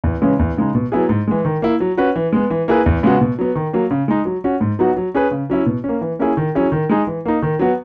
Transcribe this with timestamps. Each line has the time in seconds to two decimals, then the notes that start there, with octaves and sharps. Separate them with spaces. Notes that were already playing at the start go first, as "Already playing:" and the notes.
0.04 E2
0.21 C#3 E3 G#3 C#4
0.39 E2
0.57 C#3 G#3 D#4
0.75 B2
0.92 F#3 B3 E4 G#4
1.09 G#2
1.28 E3 G#3
1.45 D#3
1.62 A#3 E4
1.80 F#3
1.97 C#4 F#4 B4
2.16 E3
2.33 G#3 B3
2.50 E3
2.68 A#3 E4 G#4 B4
2.86 E2
3.03 C#3 G#3 B3 F#4
3.21 B2
3.39 F#3 B3
3.55 D#3
3.73 F#3 A#3
3.91 C#3
4.08 G#3 D#4
4.25 F#3
4.44 C#4 F#4
4.61 G#2
4.79 F#3 B3 D#4 F#4
4.97 F#3
5.14 C#4 G#4 B4
5.31 C#3
5.50 F#3 C#4 E4
5.66 B2
5.84 A#3 C#4
6.01 E3
6.19 A#3 C#4 E4 G#4
6.37 D#3
6.55 F#3 C#4 E4 G#4
6.72 D#3
6.89 G#3 D#4 G#4
7.07 E3
7.25 A#3 D#4
7.42 D#3
7.59 F#3 B3 F#4